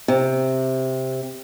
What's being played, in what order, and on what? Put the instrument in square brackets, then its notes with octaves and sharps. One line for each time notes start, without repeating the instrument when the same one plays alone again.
[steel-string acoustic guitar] C3